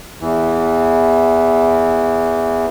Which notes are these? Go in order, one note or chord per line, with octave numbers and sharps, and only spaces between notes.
E2 E3